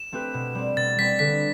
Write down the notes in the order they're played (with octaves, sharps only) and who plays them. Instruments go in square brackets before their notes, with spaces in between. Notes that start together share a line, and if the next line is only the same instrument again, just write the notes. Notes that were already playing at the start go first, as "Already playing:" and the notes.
Already playing: [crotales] E7
[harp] A3 C4 G4 B4
B2
G3 C4
[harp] B2 [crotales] A6
[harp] G3 C4 [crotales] B6
[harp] D3 [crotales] B6